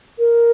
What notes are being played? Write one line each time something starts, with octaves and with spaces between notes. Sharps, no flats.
A#4